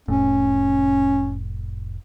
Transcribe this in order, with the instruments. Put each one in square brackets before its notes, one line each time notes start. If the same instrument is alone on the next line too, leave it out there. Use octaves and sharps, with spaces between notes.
[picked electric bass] F1 A2 [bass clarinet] C#4